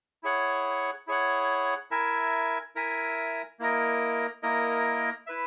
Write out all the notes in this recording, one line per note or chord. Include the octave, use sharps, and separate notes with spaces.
E4 G#4 C#5 F#5
E4 G#4 C#5 F#5
E4 A#4 E5 G#5
E4 A#4 E5 G#5
A#3 E4 A#4 D#5
A#3 E4 A#4 D#5
E4 B4 E5